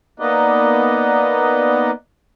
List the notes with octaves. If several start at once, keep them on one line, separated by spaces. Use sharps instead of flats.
A#3 B3 D#4 B4 D5 D#5